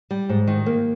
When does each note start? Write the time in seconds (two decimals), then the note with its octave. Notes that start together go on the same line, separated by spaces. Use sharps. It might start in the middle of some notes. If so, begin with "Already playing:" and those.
0.11 G3
0.29 G#2
0.47 D#3
0.66 A#3